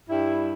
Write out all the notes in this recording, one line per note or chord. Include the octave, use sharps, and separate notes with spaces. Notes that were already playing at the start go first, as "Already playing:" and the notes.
G2 G3 E4